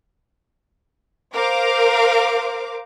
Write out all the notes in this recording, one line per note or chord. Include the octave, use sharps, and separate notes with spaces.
A#4 C5 F5 D6